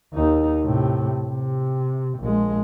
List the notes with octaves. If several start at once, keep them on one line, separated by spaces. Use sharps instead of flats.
D#2 D#4
A2 C3
C3
A#1 G#3